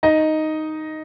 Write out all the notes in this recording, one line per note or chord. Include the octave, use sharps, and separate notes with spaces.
D#4 D#5